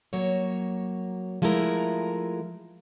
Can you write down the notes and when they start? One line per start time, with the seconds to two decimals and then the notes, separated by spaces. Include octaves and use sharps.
0.13 F#3 A#3 C#5
1.42 F3 G#3 A3 E4 A#4